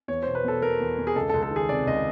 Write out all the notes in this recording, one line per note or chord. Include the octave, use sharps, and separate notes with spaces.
E2 C#5
C5
B2
B4
B2 A4
B2 A#4
E2
E2
G#4
C#2 A4
C#2 A4
A4
D#3
G#4
C3 D5
C#2 D#5